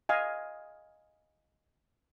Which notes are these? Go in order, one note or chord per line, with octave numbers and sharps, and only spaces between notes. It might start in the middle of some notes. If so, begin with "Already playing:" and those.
D#5 F5 G#5